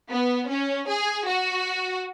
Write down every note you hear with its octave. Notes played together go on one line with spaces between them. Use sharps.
B3
C#4
G#4
F#4